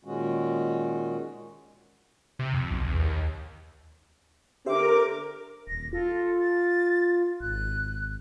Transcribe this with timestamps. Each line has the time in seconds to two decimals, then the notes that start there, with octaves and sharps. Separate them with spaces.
0.05 A#2 D#3 G#3 C#4 F#4
2.39 C3
2.54 F2
2.71 B1
2.87 E2
3.00 D#2
4.66 D3 G4 A#4 C5 E5 D6
5.67 D#1 A#6
5.93 F4 A4
6.39 A6
7.41 G#1 F#6